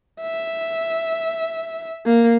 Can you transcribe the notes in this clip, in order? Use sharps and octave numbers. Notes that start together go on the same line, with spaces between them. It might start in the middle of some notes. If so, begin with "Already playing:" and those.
E5
A#3